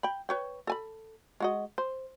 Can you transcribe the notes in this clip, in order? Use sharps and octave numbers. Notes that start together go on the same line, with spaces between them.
G5 B5
B4 C#5 G5
A4 G#5 B5
G#3 F#4 D#5
C5